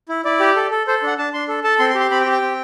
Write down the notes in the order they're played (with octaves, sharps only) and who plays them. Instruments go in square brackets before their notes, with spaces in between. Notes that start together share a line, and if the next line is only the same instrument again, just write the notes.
[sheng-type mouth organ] E4
E4 D5
G4
A4
A4
A4 C5
D4 F#5
D4 A5
D4 C6
A4
A4 A5
C4 C6
C6
G4
C6
C4 B5
G5
G4
G5
C4